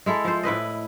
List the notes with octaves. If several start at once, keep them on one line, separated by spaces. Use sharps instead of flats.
G#3 E4 A4
F3 C5
A2 E4 B4 D#5